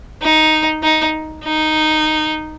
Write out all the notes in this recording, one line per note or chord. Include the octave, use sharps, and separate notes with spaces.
D#4
D#4
D#4